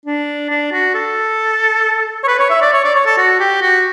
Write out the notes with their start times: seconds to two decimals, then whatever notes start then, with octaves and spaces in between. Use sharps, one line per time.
0.06 D4
0.50 D4
0.72 F#4
0.95 A4
2.24 C#5
2.28 B4
2.39 C#5
2.50 E5
2.61 D5
2.73 C#5
2.84 D5
2.96 C#5
3.06 A4
3.18 F#4
3.40 G4
3.62 F#4